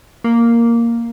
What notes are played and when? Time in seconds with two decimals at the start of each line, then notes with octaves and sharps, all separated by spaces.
0.24 A#3